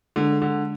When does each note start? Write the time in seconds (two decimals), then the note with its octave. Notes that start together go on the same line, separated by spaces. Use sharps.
0.16 D3 G#3 D4 A4
0.42 D3